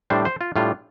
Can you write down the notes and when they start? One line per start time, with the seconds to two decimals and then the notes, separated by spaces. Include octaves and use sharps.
0.10 A2 G3 D4 C5
0.25 C5
0.41 F4
0.56 A2 G3 D4 F4